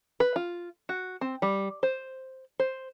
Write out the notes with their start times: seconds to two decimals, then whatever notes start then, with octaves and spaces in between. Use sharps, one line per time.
0.20 B4
0.36 F4
0.89 F#4
1.21 C4
1.42 G3
1.83 C5
2.60 C5